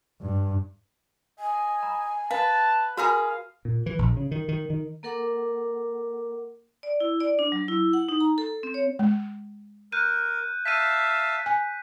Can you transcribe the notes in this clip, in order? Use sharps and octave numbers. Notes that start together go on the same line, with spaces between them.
G2
D#5 G#5
A#5 B5
B4 F5 A5
F#4 G#4 A#4 B4 F5 G5 A#5 B5
A#2
E3
A#1
C#3
D#3
D#3
D#3
A#3 A4 A#4 F#5 D6
D5
E4
D5
D4
F#3
E4
F#5
D#4
A#5
A4
C4
C#5
G#3
A#4 F#6 G6 D#7
E5 F5 A5 B6 D#7
G#5